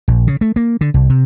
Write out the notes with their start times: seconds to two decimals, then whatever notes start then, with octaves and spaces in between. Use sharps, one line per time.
0.08 A#1
0.27 C#3
0.41 A3
0.56 A#3
0.81 D3
0.94 C2
1.10 C3